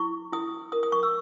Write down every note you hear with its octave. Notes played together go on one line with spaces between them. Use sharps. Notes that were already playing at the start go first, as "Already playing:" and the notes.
Already playing: E4 C#6
E4 D#6
A#4 D#6
D#6
C#6
E6